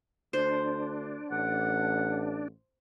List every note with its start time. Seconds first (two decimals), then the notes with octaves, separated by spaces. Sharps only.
0.33 D2 D4 C5
1.31 A1 F#5